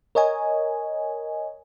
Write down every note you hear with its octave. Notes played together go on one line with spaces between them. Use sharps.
A#4 C#5 D#5 G#5